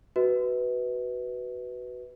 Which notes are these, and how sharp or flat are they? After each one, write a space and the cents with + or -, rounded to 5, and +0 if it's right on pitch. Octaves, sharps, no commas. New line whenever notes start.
F#4 +15 B4 +0 D#5 +40